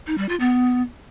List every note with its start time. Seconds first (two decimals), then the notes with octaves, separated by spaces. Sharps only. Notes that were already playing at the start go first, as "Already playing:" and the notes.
0.07 D#4
0.18 G3
0.29 F4
0.40 B3